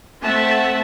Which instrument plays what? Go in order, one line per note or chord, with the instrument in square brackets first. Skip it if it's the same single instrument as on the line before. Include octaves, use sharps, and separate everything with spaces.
[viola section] A3 C4 E5 F#5 A5